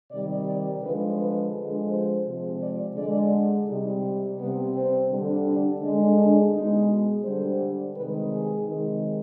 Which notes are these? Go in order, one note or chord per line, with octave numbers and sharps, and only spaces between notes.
C3 D#3 G3 D5
D5
D3 F3 G#3 B4
B4
D3 F3 G#3
C5
C3 F3 G#3
D5
D3 G#3 D5
C3 G3 D#4
C3 G3 B3
C4
D3 G3
D4
D3 G#3 D4
D4
B2 G#3 D#4
D3 G3 C5
C3 D#3 G#3 B4
G#4
C3 D#3 G#3